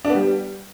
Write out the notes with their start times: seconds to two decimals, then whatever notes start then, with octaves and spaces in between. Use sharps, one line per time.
0.05 D4
0.10 B3
0.15 G3